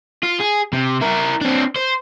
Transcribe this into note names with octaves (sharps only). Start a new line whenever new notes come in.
F4
G#4
C3
E4 A#4
C4 D4
C5